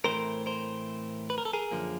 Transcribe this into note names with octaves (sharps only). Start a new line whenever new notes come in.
A2 E3 A3 C4 A#4 C5
A#4 C5
B4
A#4
A4
G#4 A#4
F#2 D3 F3 A#3